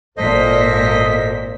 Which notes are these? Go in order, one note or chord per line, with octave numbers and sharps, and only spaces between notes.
G#1 A#2 A4 C5 D#5 B6